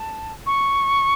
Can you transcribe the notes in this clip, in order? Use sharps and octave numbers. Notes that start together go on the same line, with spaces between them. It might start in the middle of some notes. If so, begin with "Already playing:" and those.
Already playing: A5
C#6